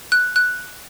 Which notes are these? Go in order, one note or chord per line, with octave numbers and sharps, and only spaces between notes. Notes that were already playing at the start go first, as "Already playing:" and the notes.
F#6
F#6